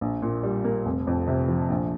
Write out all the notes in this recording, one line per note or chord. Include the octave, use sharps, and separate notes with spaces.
A#1
A#2
G3
A#3
F1
F2
C3
F3
A#1